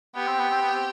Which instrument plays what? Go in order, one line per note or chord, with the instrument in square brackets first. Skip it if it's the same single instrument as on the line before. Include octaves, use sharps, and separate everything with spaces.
[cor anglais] B3 [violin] G4
[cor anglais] C4
B3
C4
B3
C4